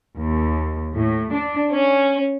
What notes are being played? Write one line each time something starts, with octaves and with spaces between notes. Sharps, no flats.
D#2
A2
D4
C#4